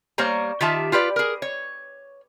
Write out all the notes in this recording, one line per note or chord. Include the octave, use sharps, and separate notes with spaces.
G3 A#3 C5 C#5 A#5
D#3 F4 G4 E5 A5
F4 G4 B4 D5
G#4 A#4
C#5